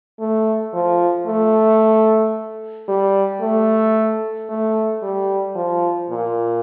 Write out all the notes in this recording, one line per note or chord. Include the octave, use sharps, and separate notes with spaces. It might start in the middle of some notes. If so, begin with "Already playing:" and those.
A3
F3
A3
G3
A3
A3
G3
F3
A#2